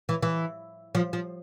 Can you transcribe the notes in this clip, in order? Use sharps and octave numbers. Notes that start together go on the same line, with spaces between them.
E3
E3
F3
F3